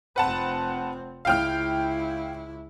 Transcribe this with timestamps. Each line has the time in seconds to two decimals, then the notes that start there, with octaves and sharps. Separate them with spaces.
0.16 F1 C4 B4 F#5 A5
1.25 C#2 E4 F5 G5 F6